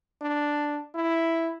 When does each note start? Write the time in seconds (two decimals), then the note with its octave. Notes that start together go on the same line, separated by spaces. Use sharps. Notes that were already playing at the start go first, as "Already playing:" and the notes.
0.22 D4
0.95 E4